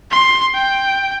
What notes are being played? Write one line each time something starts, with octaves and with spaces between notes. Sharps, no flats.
C6
G5